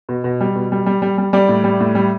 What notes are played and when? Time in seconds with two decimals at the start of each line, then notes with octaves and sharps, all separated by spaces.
0.09 B2
0.24 B2
0.41 G3
0.56 B2
0.72 G3
0.86 G3
1.02 G3
1.18 G3
1.33 G3 D5
1.49 A2
1.64 G3
1.80 A2
1.95 G3